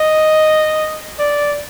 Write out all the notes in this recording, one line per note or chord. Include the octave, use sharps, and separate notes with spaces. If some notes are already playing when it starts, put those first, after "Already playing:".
Already playing: D#5
D5